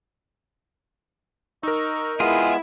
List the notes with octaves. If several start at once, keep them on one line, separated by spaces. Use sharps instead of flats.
D#4 A#4 D#5 C#6 E6
G#3 B3 E4 F4 G#4